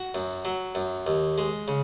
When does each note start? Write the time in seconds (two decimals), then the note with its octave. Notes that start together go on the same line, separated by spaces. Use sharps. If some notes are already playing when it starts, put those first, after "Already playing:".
Already playing: F#4
0.15 F#2
0.45 F#3
0.75 F#2
1.07 D#2
1.38 G#3
1.68 C#3